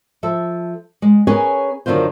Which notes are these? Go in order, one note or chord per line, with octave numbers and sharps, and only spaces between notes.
F3 A4 E5
G#3
C#4 G#4 A#4 B4 C#5 G#5
F#2 D3 D#3 F4 C5